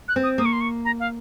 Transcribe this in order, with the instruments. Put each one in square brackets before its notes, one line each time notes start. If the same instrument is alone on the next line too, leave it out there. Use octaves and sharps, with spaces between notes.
[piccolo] F#6
[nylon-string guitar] C4
[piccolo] D#6
[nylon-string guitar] A#3 [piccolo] D#6
[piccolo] C#6
C6
C#6
A#5
F5